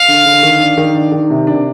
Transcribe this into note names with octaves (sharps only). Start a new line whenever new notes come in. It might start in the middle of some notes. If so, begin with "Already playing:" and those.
Already playing: F5
D3
D3
D#3
D4
D#3
D4
D#3
C3
D4